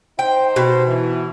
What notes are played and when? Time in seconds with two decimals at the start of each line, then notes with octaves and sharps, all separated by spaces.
0.19 D#4 C5 G5
0.56 B2
0.87 E3